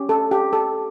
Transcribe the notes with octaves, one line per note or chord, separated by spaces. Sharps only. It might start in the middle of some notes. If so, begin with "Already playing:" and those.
Already playing: C#4 G4
A4
G4
A4